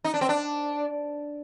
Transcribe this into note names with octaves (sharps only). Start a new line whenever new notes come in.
D#4
D4
C4
D4